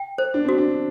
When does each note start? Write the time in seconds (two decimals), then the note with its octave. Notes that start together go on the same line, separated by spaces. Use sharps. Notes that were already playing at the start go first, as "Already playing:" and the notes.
Already playing: G5
0.18 C5
0.34 D4
0.45 C4 F#4
0.58 D4